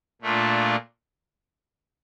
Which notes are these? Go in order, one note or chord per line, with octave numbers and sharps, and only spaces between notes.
A#2 A3 D4 F4